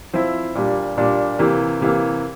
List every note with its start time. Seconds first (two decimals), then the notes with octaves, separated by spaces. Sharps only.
0.13 F3 C4 E4
0.55 A#2 G3 D4
0.97 A#2 G3 D4
1.39 C3 E3 A#3
1.81 C3 E3 A#3